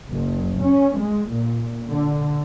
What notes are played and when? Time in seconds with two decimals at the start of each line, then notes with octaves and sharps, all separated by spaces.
0.11 F#1
0.61 C#4
0.99 G#3
1.30 A#2
1.89 D3